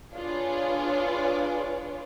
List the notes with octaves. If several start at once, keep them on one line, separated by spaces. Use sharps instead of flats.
D4 F4 G#4 B4 C#5 D5